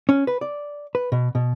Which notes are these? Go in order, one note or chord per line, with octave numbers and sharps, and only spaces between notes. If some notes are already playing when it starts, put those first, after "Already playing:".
C#4
B4
D5
B4
B2
B2